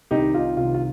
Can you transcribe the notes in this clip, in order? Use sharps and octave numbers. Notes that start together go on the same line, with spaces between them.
C2 C3 D#3 D#4 G4
F4
C2 C3 D#3 F4
F4